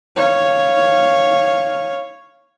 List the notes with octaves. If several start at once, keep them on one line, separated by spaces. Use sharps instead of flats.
C#5 F5